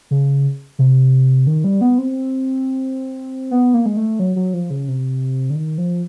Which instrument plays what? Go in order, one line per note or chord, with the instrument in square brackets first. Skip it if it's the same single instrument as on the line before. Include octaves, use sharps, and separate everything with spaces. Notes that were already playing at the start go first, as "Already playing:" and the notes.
[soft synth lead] C#3
C3
D#3
G3
B3
C4
B3
A#3
G#3
A3
F#3
F#3
F3
C#3
C3
D3
D#3
F3